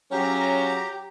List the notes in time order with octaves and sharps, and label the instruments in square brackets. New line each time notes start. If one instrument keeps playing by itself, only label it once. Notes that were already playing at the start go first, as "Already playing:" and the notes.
[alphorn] F#3 [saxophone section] C#4 F4 G#4 [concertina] G4 [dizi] A#5